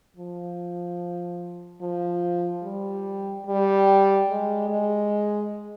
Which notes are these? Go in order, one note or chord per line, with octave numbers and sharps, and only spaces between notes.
F3
F3
G3
G3
G#3
G#3